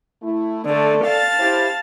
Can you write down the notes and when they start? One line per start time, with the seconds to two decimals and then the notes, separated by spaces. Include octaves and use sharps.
0.23 A3 E4
0.65 D3 A3 A4 D5
1.04 F5 A5 A6
1.40 E4 G4 C5